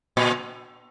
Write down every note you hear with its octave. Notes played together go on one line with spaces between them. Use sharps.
A#2